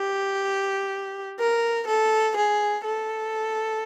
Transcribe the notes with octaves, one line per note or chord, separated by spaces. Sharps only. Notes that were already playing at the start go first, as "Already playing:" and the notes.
Already playing: G4
A#4
A4
G#4
A4